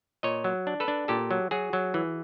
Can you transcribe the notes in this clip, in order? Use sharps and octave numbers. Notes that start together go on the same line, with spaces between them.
A#2 C#5 D#5
F#3
D4
A4 B4
D4
A#2 G4 A4
F#3
F#3 F#4 G#4
F#3
E3